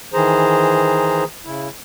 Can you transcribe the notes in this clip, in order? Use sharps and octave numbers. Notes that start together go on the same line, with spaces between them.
D#3 E3 G#4 C5 A#5
C#3 E4